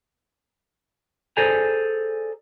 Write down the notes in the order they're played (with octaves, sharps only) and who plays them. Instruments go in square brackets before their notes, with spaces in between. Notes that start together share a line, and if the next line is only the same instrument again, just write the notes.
[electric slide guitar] G#4 A4 C5 D5 G#5 A#5